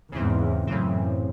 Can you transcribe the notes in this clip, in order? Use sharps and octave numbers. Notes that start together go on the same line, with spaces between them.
E2 G#2 C#3 E3 C4
F#2 A2 C#3 E3 C4